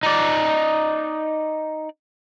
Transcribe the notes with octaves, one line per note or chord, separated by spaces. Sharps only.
D#4 D5